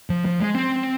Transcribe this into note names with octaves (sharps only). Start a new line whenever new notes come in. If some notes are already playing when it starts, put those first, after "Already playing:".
F3
F3
G#3
C4